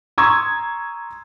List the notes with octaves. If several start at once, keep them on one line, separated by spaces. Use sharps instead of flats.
A#5 C6 C#6 D#6 E6 G#6